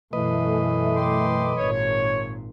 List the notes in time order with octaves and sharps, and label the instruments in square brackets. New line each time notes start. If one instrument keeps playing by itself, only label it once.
[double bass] F#2 B2 [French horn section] E3 A3 [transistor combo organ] B4 D#5
[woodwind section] G5 C6 D6
[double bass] G#1 A#2 [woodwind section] C#5